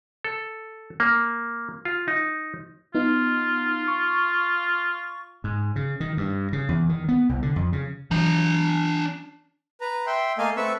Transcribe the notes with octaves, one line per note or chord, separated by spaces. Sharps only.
A4
A#3
F4
D#4
B3 D#4 F4
C#6
G#2
C#3
D#3
G2
C#3
E2
D#3
B3
C2
D3
F2
C#3
E3 F#3 D4 A#5
B4 A#5
E5 G5 C6
A3 A#3 D#5 F5 G#5
A3 C4 B4 E5 C#6 E6